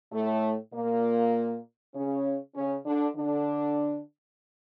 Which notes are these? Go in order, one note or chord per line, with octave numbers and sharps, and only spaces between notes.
A2 A3
A#2 A#3
C#3 C#4
C#3 C#4
D3 D4
D3 D4